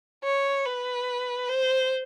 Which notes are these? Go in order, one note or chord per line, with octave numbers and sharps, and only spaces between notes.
C#5
B4
C5